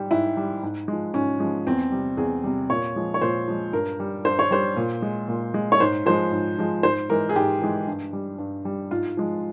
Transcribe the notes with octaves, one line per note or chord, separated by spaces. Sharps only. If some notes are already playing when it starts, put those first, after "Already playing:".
Already playing: G#2 G3 G4
G#2 E4
G3
G#2
F3 G#3
G#2 C#4
F3 G#3
E2 C4
C3 G3
E2 G#4
C3 G3
A#2 C#5
F3 G#3
C#5
A#2 C5
F3 G#3
G2 A#4
G3
G2 C5
C#5
G3 C5
A#2
G#3
A#2
G#3
C#5
G#2 C5
F3 G#3 C5
G#2
F3 G#3
G#2 C5
E3 G#3 A#4
G#4
G#2 G4
E3 G#3
G2
G3
G2
G3
G#2 F4
F3 G#3